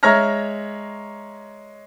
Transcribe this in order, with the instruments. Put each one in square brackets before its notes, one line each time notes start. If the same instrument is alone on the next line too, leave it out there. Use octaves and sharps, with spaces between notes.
[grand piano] G#3 C#5 E5 A#5 F6 A#6